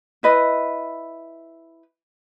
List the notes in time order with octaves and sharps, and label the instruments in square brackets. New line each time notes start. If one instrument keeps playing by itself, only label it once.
[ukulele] E4 B4 D#5